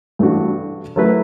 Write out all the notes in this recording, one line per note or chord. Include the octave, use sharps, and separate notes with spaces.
G2 E3 A3 D4 F#4
F#3 A3 E4 B4